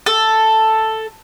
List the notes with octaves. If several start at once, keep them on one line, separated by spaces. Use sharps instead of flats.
A4